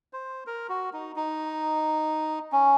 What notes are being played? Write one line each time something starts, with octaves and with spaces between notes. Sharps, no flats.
C5
A#4
F#4
D#4
D#4
C#4